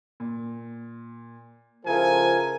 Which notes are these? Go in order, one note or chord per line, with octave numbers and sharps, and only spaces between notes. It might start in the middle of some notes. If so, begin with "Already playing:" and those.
A#2
C#3 F3 E4 A4 A#4 G#5